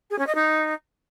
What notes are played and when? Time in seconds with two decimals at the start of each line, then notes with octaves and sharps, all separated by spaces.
0.11 G#4
0.19 C#4
0.27 D#5
0.35 D#4